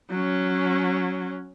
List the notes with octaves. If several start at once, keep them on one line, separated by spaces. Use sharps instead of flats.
F#3 C#4